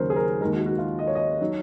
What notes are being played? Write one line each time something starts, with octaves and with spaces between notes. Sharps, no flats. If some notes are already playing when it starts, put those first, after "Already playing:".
Already playing: D#2 C#3 F#3 A#4 C5
G#4
A#4
D#2 D#3 G#3 A#4
F#4
F#4
F4
D#5
C#5
D#5
D#3 F#3